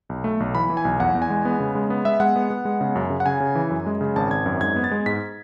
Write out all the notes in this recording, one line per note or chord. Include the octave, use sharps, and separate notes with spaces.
B1
A3
B1
E3 B5
E3
G#5
B1
E2 F#5
E2
G#5
G#3
B3
C#3
G#3
B3
G#3 E5
G#3 F#5
B3
B3
G#3
C#3
F#2
C#3
F#5
C#3 G#5
C#3
E3
F#2
G#3
C#3
G#1 A5
G#1 G#6
F#2
G#2 G#6
B3
A6
G#3
G#2 B6